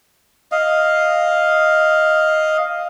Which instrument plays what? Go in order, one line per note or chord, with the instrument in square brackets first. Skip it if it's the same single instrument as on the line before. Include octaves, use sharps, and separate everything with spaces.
[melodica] D#5 F5